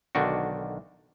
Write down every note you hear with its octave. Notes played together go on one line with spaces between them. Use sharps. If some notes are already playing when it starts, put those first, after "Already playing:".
B1 D3 D#3 D4 F#4